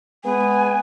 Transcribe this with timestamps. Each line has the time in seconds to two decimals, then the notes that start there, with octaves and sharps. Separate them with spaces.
0.24 G#3 B3 G#5